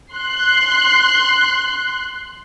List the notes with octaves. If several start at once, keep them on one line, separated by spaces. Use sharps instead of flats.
C6 F#6